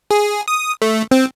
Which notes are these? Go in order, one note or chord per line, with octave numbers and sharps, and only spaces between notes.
G#4
D#6
A3
C4